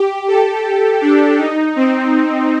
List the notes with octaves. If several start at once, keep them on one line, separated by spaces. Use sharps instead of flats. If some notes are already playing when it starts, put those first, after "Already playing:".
Already playing: G4
A4
D4
D#4
C4